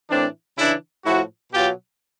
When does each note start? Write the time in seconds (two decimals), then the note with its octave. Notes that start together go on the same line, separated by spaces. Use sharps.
0.10 A2 E3 C4 D4
0.57 C#3 E3 D4 E4
1.05 A2 F3 E4 F#4
1.53 B2 F#3 F4 G4